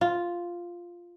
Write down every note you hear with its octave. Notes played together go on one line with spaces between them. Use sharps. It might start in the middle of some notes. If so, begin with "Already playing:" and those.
F4